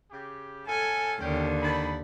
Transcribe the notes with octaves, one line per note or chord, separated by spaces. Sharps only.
C#3 G4
A2 A4 F5 G#5
D#2 D3 C#4 A#4 G5
D#3 A5 B5